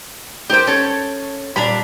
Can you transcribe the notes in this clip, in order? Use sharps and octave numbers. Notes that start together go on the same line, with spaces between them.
D#4 G4 A#4 C5 G5
C#4 A4 C#5
D#2 A#2 G3 D4 A#5 B5